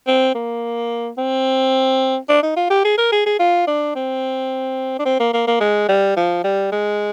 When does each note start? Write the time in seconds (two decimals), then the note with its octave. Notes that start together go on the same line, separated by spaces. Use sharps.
0.07 C4
0.35 A#3
1.18 C4
2.29 D4
2.43 D#4
2.56 F4
2.70 G4
2.85 G#4
2.98 A#4
3.12 G#4
3.26 G#4
3.40 F4
3.67 D4
3.95 C4
4.99 D4
5.05 C4
5.20 A#3
5.34 A#3
5.48 A#3
5.61 G#3
5.89 G3
6.17 F3
6.44 G3
6.72 G#3